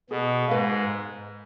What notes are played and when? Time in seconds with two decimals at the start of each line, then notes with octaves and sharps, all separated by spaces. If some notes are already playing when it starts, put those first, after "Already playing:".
0.10 B2 G#4
0.48 G#2 B4 F5